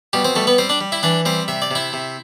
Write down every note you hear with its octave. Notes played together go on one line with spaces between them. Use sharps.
B2 G3 G4
C4 C5
G3 A3 A4
B3 B4
G3 C4 C5
D4 D5
G3
E4 E5
E3 D4 D5
G3 C4 C5
C3 E5
D5
C3 E4 E5
C3